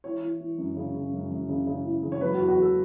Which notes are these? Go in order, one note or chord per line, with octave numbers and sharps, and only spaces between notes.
E3 C#5
E3
E3
F#2
C#3
C#3
F#2
F#2
C#3
C#3
E3
C#3
C#5
F#3 B4
F#4
E2
F#4
E2 A4